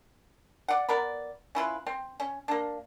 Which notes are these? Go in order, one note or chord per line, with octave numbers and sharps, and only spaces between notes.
D5 F#5
B3 A#4 D5 B5
C#4 E4 F4 B4
C4
C#4
A#3 D4